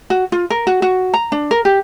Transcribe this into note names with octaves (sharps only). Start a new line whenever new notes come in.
F#4
F4
A#4
F#4
F#4
A#5
D4
A#4
G4